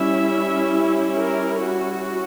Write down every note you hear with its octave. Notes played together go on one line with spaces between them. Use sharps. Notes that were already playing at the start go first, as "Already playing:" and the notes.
Already playing: G3 C#4 E4 E5
A#4
F#4